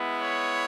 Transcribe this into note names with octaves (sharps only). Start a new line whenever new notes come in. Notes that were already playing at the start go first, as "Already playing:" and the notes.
Already playing: G#3 B3 E4
C#5